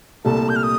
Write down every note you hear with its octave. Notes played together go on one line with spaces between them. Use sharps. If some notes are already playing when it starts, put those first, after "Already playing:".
C2 A#2 A3 A5
G6
F6
D#6